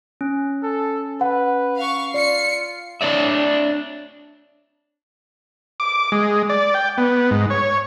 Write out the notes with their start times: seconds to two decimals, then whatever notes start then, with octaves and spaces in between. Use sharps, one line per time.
0.21 C#4
0.63 A4
1.21 B4 F#5
1.78 F5 C#6
2.14 F4 D5 C7 C#7
3.01 D4 C#5 D5 E5
5.80 D6
6.12 G#3
6.49 D5
6.74 G5
6.98 B3
7.31 G#2
7.50 C#5